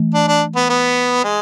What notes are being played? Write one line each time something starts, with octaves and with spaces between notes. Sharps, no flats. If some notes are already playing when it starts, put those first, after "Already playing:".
Already playing: E3 A3
D4
D4
B3
B3
G#3